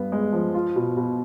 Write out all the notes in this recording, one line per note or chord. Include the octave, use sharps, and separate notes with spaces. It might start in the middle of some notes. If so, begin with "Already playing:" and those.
Already playing: G2 B3
G#3
F3
F4
B2
B2